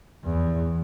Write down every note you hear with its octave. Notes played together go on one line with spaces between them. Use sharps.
E2